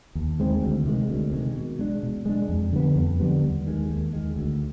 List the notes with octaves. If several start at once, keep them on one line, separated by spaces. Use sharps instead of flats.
D#2
D#3 G#3 C4
D2
C3 D#3 G#3
D2
C3 D#3 G#3
B2
G#3 D4
B2
G#3 D4
F2
D3 G3 B3
F2
D3 G3 B3
D#2
D#3 G#3
D#2
D#3 G#3
D2